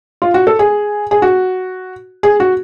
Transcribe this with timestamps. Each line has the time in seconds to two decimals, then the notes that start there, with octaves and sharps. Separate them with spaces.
0.22 F4
0.34 F#4
0.47 A4
0.59 G#4
1.11 G#4
1.22 F#4
2.23 G#4
2.40 F#4